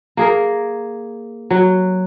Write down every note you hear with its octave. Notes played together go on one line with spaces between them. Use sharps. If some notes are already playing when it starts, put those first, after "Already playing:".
A#3 G#4 A#4
F#3